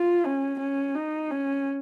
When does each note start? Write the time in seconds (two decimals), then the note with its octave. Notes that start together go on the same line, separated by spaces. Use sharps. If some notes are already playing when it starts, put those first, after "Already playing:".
Already playing: F4
0.25 C#4
0.60 C#4
0.95 D#4
1.31 C#4